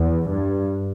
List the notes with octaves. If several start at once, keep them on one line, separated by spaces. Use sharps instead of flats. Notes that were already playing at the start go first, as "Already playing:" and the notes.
Already playing: E2
G2